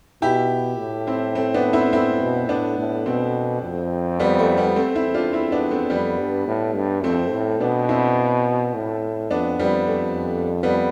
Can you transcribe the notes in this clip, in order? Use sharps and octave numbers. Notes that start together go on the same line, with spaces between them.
B2 E4 G4
A2
C4 E4
A3 C4
B3 D4
C4 E4
A2 C4 E4
B2
A2 B3 D4
A2
B2 A3 C4
F2
G3 B3
A3
G3 B3
A3 C4
C4 E4
E2
D4 F4
C4 E4
B3 D4
A3 C4
F2 G3 B3
G2
A2
G2
F2 A3 C4
A2
B2 B3 D4
C4 E4
A2
F2 B3 D4
F2 G3 B3
F2 A3
G3 B3